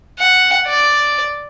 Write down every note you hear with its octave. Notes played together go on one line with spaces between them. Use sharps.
F#5
D5